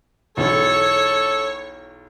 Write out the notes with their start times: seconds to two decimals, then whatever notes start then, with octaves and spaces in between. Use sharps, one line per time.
0.37 B1 E2 B2 A4 C#5